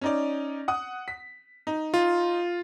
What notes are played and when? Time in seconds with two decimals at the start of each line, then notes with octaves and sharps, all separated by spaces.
0.01 C#4 D#4 D5
0.68 F#5 D#6
1.08 B6
1.67 D#4
1.94 F4